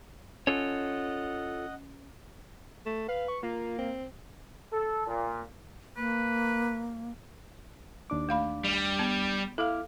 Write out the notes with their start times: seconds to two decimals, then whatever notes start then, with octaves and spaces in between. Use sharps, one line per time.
0.47 C#4 F4 A4 C#5 D#5 F#5
2.86 A3
3.08 B4 F5
3.28 C#6
3.43 A#3 F4
3.78 C4
4.72 A4
5.07 A#2
5.97 A#3 B4
8.10 D#2 D4 D6
8.29 A3 F5 B5
8.64 G3
8.99 B3
9.58 E4 A4 F5 D6 F6